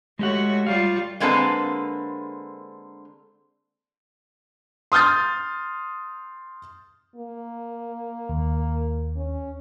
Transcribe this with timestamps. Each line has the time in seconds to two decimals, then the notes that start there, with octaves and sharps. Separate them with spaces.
0.19 G#3 A3 F#4 G4 C#5 F#5
0.67 G3 F4 F5
1.20 D3 G#3 A#3 C4 A4 B4
4.92 C6 D#6 F6 G6 A6
7.16 A#3
8.29 D#2
9.16 C#4